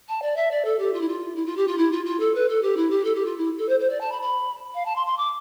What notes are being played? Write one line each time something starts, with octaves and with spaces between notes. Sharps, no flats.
A5
D5
E5
D5
A4
G4
F4
E4
F4
E4
F4
G4
F4
E4
F4
F4
A4
B4
A4
G4
E4
G4
A4
G4
F4
E4
A4
C5
C5
D5
A5
B5
B5
F5
A5
C6
C6
D6